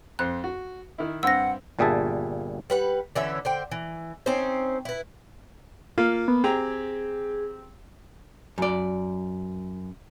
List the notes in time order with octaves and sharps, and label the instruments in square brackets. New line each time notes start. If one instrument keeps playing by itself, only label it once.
[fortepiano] F2 C5 [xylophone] F#6
[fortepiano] F#4
D#3 E4
[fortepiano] G2 C4 [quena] F#5 [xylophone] E6 A#6
[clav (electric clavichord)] G1 A#2 G3 G#4 E5 A5
[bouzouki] G3 B4 F#5
D3 E3 C#4 E5
D3 C5 G5
E3
C4 C#4 D#4 C5
E4 B4
[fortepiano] A#3 [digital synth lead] F4
[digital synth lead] B3
[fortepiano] C4 G4 A#5 [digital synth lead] G#4
[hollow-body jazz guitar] F#2 D5